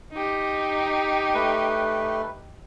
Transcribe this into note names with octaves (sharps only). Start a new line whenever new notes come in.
D#4 G4
A3 B4